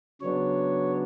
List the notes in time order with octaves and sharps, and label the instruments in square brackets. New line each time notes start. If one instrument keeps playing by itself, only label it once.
[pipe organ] C#3 F#3 B3 D4 C#5